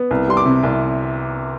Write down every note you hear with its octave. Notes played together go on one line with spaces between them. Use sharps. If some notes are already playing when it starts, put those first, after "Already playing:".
Already playing: B3
C2
G3 C6
D6
C3
C2